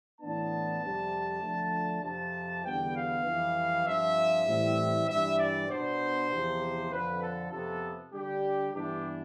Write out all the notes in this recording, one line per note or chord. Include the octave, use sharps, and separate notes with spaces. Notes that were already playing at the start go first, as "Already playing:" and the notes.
A2 E3 B3 D4 A5
F2 C3 G3
D3 F3 A3 D4
F2 C3 F3 A5
E2 D3 G3 B3 G5
F5
F2 E3 G3
G2 F3 C4 E5
A2 E3 G3 C4
G2 E3 G3 E5
D5
B2 B3 D4 C5
E2 C3 F3
F2 D3 F3 C4 B4
A4
F2 C3 F3 B3 A4
D3 G3 D4 G4
G2 E3 B3 D4 G4